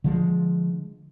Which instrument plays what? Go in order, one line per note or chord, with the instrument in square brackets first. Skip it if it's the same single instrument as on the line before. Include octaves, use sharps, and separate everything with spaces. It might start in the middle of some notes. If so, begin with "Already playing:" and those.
[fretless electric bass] D3 F3 G#3